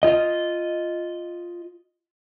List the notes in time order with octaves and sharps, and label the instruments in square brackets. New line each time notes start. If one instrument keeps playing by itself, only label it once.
[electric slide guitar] F4 D#5